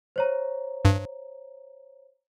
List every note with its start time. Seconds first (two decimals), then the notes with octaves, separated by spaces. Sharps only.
0.16 C5 C#5 A#5
0.85 G2